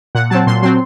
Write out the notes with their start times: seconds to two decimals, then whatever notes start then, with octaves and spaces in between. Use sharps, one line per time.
0.15 A#2 F#5
0.30 F#3 C4 A5
0.47 A#2 C6
0.62 F#3 C4 C6